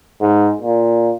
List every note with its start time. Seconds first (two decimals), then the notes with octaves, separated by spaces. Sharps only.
0.22 G#2
0.62 A#2